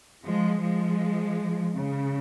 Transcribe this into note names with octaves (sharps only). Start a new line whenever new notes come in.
F3 G#3
F3 G#3
C#3